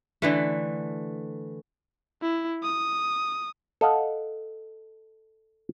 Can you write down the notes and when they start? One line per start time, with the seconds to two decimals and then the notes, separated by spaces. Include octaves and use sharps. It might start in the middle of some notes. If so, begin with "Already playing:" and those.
0.22 D3 E3 A3
2.22 E4
2.63 D#6
3.81 A4 D#5 F5 F#5